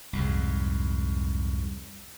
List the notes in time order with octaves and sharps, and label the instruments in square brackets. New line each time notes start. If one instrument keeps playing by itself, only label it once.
[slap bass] C2 F2 G#2